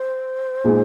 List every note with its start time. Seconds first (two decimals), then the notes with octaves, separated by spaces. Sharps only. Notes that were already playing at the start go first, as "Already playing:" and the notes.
Already playing: C5
0.64 A#2 G#3 D#4 G#4